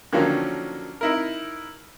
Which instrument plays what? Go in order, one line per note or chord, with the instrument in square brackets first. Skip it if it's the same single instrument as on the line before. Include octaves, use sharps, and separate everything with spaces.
[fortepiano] D3 D#3 F3 F#3 A#3 C#4
D#4 E4 A#4